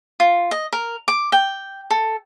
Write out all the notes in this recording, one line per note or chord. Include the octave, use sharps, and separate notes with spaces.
F4
D#5
A#4
D6
G5
A4